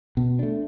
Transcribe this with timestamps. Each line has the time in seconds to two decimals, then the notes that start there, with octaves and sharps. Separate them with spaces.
0.17 B2
0.39 A3 D4